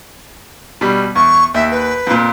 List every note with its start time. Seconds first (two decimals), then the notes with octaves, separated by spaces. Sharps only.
0.81 B2 G3
1.15 E2 C#6
1.54 D#2 E5
1.71 B4
2.07 F2 A#2